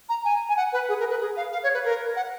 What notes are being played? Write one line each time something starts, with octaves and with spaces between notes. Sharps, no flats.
A#5
G#5
G#5
F#5
B4
G#4
A#4
B4
G#4
F5
F5
C#5
B4
A#4
F#5